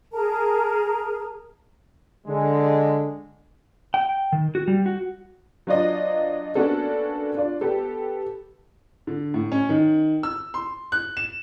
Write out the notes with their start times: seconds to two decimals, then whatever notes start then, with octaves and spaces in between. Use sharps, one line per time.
0.12 G#4 A#4 A5 A#5
2.27 D3 G#3
3.94 G5
4.33 D#3
4.55 F#4
4.68 G3
4.86 F#4
5.67 F#3 D4 F4 C5 D5 D#5
6.55 A#3 B3 C#4 D4 F#4 A4
7.35 D4 F4 D5
7.61 B3 G4 A4
9.07 D3
9.34 A2
9.52 C#4
9.69 D#3
10.23 E6
10.54 C6
10.92 F#6
11.17 E7